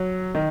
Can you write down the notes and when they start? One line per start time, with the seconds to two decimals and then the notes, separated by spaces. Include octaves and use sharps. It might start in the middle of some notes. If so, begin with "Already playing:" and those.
Already playing: F#3
0.35 D#3